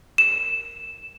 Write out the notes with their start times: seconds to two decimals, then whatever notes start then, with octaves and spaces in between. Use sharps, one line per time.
0.18 E7